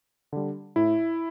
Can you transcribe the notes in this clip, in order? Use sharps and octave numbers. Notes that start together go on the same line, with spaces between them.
D3 G3
A2 E4